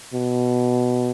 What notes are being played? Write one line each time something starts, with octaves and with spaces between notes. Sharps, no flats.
B2